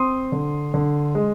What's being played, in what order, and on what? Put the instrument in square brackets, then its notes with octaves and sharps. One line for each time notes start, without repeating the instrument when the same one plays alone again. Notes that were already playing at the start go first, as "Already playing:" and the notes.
Already playing: [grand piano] C4 C6 D#6
D3
D3
G#3